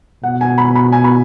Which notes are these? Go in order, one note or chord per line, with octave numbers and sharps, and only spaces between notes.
B2 F#5
G#5
B5
B5
G#5
B5